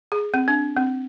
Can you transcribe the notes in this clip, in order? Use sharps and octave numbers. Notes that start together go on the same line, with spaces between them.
G#4
C4
D4
C4